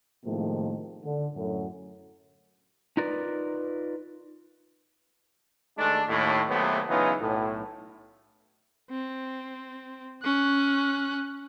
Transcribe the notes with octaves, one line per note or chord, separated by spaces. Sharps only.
A2 C3 D#3 F3 G#3 A#3
D3
F#2 A2
D#4 F4 A#4 B4 D5
D#2 G#3 A3 D4
D#2 A2
D#2 C3 F#3 A3 B3
C#3 E3 F#3 B3 D#4 F4
B1 A2
C4
C#4 F#6